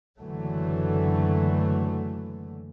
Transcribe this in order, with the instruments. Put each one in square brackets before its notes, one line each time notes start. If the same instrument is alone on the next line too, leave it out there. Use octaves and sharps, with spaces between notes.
[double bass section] F#1 D3 E3 F#3 A3